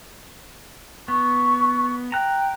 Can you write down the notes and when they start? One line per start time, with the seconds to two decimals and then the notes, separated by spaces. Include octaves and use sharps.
1.08 B3 C#6
2.12 G5 A#5 F#6